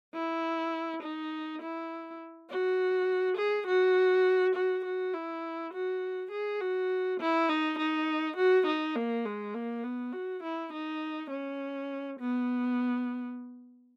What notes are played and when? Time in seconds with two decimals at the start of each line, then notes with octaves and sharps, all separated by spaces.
0.15 E4
1.02 D#4
1.62 E4
2.50 F#4
3.37 G#4
3.67 F#4
4.55 F#4
4.85 F#4
5.14 E4
5.73 F#4
6.31 G#4
6.61 F#4
7.20 E4
7.49 D#4
7.78 D#4
8.37 F#4
8.67 D#4
8.96 A#3
9.25 G#3
9.55 A#3
9.84 B3
10.13 F#4
10.43 E4
10.73 D#4
11.30 C#4
12.19 B3